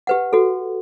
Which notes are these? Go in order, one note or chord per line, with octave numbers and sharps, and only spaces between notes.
G4 B4 F#5
F#4 A4